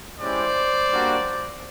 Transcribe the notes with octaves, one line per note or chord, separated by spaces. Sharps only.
G#3 C#4 E4 G4 C5 D5
G3 A#3 D4 F#4